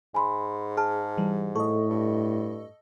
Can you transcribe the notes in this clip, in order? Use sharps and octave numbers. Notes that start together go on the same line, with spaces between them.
G#2 G#5 B5 C6
G#4 A5 F6
E3 G3
A2 A4 D#5 C#6
G2